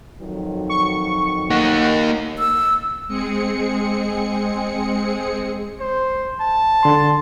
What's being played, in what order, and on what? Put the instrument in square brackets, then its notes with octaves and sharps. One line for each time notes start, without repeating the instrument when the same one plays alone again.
[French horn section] F2 D#3 F#3
[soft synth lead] C#6
[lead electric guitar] A#3 D#4 [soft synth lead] F#5
[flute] E6
[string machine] G#3 C4 G#4 C#7
[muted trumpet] C5
A5
[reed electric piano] D3 C6